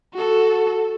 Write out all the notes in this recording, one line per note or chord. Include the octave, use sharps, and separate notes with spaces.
F#4 A4